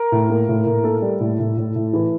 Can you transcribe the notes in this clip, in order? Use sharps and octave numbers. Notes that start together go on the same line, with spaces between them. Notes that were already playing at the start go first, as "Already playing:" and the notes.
Already playing: A#4
A2
A#3
A2
A2
A#3 A4
G3
A2
A2
A2
A2
E3